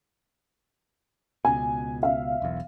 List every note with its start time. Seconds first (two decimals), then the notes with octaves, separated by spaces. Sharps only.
1.45 C#2 B2 G#5
2.03 E5 F5
2.42 E1 B1 E2